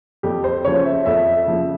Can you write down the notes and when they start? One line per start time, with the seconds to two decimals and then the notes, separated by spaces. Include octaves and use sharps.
0.23 F2 G4
0.44 C5
0.65 C#3 F3 C#5
0.85 E5
1.06 F2 E5
1.47 C#3 F3